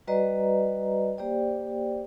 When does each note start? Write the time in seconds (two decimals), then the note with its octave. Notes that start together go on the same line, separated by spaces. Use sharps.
0.07 G3 F#4 B4 D5 D#5 A#5
1.18 A#3 G4 C5 D5 G5